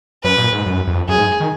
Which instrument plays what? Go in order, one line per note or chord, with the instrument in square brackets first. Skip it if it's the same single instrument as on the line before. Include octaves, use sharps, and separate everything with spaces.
[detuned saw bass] F#2 [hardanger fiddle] B4
[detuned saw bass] A#2
G#2
F#2
F2
[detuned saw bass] F#2 [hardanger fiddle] G#4
[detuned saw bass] G#2
D#3